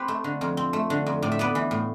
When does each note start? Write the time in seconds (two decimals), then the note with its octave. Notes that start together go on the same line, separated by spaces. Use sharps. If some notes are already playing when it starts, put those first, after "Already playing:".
Already playing: C4 G4 B4
0.08 A3
0.24 D3
0.41 F2
0.57 C4
0.73 A3
0.90 D3
1.06 F2
1.22 A2 D5
1.32 E5
1.39 B3 B4 D5
1.55 E3
1.71 A2